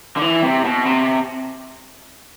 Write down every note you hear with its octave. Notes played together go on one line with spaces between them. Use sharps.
D3
E3
C3
B2
C3